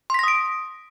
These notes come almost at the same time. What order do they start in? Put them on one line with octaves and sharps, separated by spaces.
C6 B6 A#6 D#6 D7